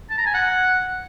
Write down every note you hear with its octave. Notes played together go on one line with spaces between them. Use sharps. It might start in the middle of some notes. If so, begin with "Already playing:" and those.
A5
A#5
G#5
F#5